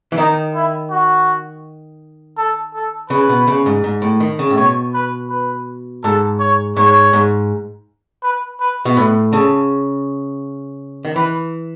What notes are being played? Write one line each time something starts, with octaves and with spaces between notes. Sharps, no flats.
E3
D#3 D#4
E4
F#4
A4
A4
C#3 B4
B2
C#3
G#2
G#2
A2
D#3
C#3
A2
B2 C#5
B4
B4
G#2 A4
C#5
G#2 C#5
G#2
B4
B4
B2
A2 B4
C#3 A4
D#3
E3 B4